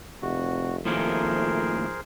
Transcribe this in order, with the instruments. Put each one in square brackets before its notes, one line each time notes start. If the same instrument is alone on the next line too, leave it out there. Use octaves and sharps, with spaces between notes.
[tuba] F1 [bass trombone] C3 [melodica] F#4
[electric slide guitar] A2 D#3 A#3 [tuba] F3 [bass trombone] A3 [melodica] G#4 A#4 C5